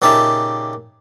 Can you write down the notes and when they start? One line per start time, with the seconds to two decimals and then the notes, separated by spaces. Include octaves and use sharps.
0.02 A#2 C#3 D#4 G4 E5 A5